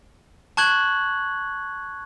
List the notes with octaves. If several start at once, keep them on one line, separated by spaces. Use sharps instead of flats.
A5 C#6 F#6 G#6 F#7